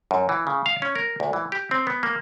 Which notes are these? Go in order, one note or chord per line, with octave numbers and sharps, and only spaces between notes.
F#2
E3
C#3
F5
C#4
A#4
D2
E3
G4
C4
B3
A#3